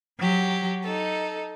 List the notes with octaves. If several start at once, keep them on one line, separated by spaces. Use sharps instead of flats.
F#3 G4
D#4 A4